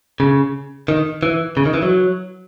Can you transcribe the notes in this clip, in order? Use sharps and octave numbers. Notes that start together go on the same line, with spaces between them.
C#3
D#3
E3
C#3
D#3
E3
F#3